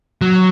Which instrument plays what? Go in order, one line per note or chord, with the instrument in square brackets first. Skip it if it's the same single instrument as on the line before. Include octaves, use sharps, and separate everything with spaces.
[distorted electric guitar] F#3